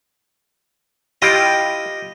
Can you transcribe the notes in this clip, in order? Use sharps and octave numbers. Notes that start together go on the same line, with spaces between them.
E4 F4 G4 D#5 G5